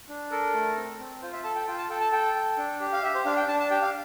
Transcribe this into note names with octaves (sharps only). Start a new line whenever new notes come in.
D4
A4 A#4
A3
C4
C4
F4 C5
E5
A4 A5
G5
F4 G5
A5
A4 G5
A5
A4 G5
A4
D4
G4
F5
G4 E5
C5
D4 F5
G5
D4 A5
A5
G4 G5
F5